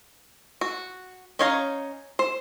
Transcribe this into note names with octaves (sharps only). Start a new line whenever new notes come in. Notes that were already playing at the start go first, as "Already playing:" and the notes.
F#4
C#4 D#4 C#5 F5 A#5
C5